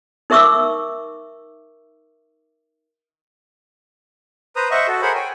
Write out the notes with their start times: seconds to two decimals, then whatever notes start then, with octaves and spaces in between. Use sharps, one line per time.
0.30 D#4 A#4 E5 C#6 D6 E6
4.56 B4 C5 A#5 D#6
4.71 C5 D#5 E5 F#5 C#6
4.87 F#4 A4
5.02 G#4 A#4 C5 C#5 F#5 B5
5.15 G5 G#5